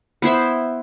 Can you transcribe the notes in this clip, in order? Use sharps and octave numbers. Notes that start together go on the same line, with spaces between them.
B3 E4 C5 E5